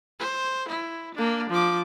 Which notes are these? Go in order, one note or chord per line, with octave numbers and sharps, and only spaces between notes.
C5
E4
A#3 D4
F3 D6